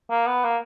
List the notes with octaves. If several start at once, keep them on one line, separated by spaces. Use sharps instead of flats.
A#3
B3
A#3